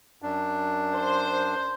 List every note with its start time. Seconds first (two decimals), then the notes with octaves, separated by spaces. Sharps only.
0.22 F#2 D4
0.95 C5